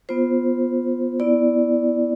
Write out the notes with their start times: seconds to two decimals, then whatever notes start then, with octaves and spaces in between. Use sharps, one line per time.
0.09 B3 F4 C5
1.20 B3 E4 D5